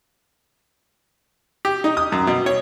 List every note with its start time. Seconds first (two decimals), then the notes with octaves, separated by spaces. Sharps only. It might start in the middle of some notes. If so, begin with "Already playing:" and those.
1.65 G4
1.84 D#4
1.97 D#6
2.12 F#2
2.27 B2
2.46 C#5